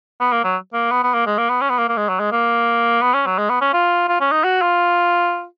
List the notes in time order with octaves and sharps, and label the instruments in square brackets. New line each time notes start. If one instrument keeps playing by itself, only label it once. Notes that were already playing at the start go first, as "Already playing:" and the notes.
[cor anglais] B3
A#3
F#3
A#3
B3
B3
A#3
G#3
A#3
B3
C#4
B3
A#3
A#3
G#3
F#3
G#3
A#3
B3
C#4
F#3
G#3
B3
C#4
F4
F4
C#4
D#4
F#4
F4